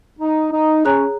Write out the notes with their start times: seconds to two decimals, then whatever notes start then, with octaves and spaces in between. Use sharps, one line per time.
0.19 D#4
0.52 D#4
0.85 C#4 G#4 C#5 A#5 F#6